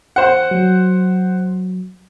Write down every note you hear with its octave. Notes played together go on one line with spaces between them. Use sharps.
C5 F#5
F#3